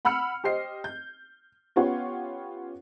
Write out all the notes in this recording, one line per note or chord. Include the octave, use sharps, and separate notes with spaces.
F#5 B5 E6 F6 C#7
G4 C5 D#5 C7
G6
B3 C#4 F4 G4 C#5 F#5